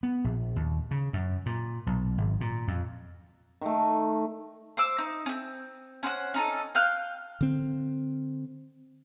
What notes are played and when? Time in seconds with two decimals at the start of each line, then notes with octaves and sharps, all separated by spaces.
0.03 B3
0.24 A#1
0.56 D#2
0.91 C#3
1.13 F#2
1.46 A#2
1.87 B1
2.18 G#1
2.41 A#2
2.68 F2
3.61 D#3 A3
4.77 C5 D6 E6
4.98 D#4
5.26 C4 C#4
6.03 C#4 C5 F#5 F#6
6.34 C#4 D#4 A4
6.75 F5 G5 F6 F#6
7.41 D3 C4